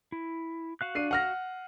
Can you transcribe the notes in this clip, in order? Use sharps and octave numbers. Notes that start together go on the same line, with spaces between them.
E4
F#4 F5 F#6
D4 C7 D#7
F#5 F6 A#6